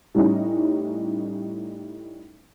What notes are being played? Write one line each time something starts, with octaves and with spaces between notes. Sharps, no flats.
A2 G3 C#4 D#4